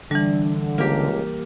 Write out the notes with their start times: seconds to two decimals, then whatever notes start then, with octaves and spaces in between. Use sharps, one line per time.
0.11 D3 E3 G3 D4
0.78 C#2 A#3 G4